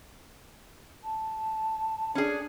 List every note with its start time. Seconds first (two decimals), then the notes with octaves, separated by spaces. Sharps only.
1.04 A5
2.15 C#4 D4 G#4